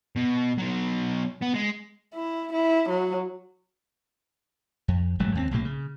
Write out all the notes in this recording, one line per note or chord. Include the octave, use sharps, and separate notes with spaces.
B2
B2 F#3
B3
G#3
E4
E4
F#3
F2
E1 G#2 F#3 A3
D#2 A#3 C4
B1 A2 C3 A#3
C#3